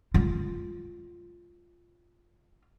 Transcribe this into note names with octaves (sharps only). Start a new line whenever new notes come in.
G#3 F4